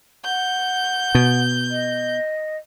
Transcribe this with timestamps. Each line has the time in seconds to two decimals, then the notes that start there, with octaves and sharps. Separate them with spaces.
0.24 F#5 G6
1.15 B2
1.70 D#5